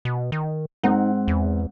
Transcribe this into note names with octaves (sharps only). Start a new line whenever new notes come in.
B2
D#3
G#2 C4 D#4 F#5
E2